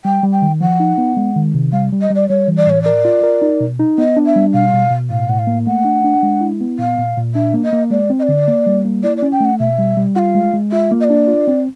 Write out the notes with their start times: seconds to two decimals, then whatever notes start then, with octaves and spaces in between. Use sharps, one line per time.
0.05 G3 G5
0.23 G3
0.32 G5
0.42 D#3
0.61 F3 F#5
0.80 D#4
0.98 B3
1.17 G#3
1.36 D#3
1.54 C3
1.72 G3 F5
1.92 G3
2.01 D#5
2.10 G3
2.15 D5
2.29 G3 C#5
2.48 E3
2.57 D5
2.66 A2 C#5
2.83 A#4 D5
3.05 F4
3.23 A#4
3.42 D#4
3.60 B2
3.79 D#4
3.98 B3 D#5
4.17 D4
4.26 E5
4.36 G3
4.53 B2 F5
4.73 B2
4.91 B2
5.10 A2 F5
5.29 A2 F#5
5.39 F5
5.47 A#3
5.67 A3 F#5
5.85 D4
6.04 D4
6.23 G#3
6.41 E4
6.61 B3
6.79 A#2 F5
6.98 A#2
7.17 A#2
7.34 D4 E5
7.54 A#3
7.64 D#5
7.73 A#3
7.91 G#3 D5
8.10 C4
8.19 D#5
8.23 D5
8.29 D3
8.48 A#3
8.66 G3
8.85 A#3
9.03 E4 D5
9.17 D5
9.22 C#4
9.32 G5
9.40 A3 F#5
9.59 B2 E5
9.79 G3
9.97 G3
10.15 F4 F5 F#5
10.35 G#3
10.53 G#3
10.72 F4 E5
10.91 A#3
11.00 D#5
11.04 D5
11.10 D4
11.28 F4
11.48 C4